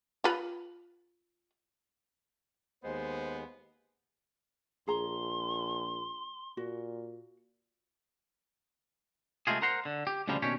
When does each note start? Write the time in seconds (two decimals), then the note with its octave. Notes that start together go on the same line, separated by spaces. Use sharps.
0.24 F4 B4
2.84 D#2 G#3 B3 C5
4.88 A#1 G#4 A#5 C6
6.57 A#2 F#4
9.47 C3 G#3 A3 C4 F4 G#4
9.62 A#4 C5 F#5 A#5 C6
9.85 D3
10.07 G4
10.28 D2 A#2 C#3 F3 G3 G#3
10.42 D#2 B2 C#4 D4 G4 C#5